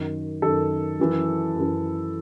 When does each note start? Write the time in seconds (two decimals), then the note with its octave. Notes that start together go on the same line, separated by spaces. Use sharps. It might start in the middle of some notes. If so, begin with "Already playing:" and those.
Already playing: F#2 D#3
0.42 F#2 D#3 A4
0.99 F#2 E3
1.56 F#2 E3